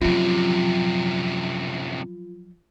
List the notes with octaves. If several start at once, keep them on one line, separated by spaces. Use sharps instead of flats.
F#2 C3 F3 F#3 F4